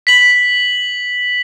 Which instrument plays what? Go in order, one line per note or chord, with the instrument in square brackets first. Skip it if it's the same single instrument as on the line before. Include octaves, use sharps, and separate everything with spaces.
[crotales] B6 F#7